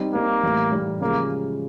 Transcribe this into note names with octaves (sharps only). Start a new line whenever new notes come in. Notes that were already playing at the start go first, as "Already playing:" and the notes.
Already playing: G3 C4 D#4
G3 A#3 C4 D#4
A2 E3 G3
A2 E3 G3
C#3 F3 G#3 A#3